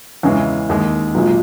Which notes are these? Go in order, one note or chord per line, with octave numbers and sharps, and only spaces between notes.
E2 C#3 E3 G#3
D#2 D#3 G#3
B1 A#2 G#3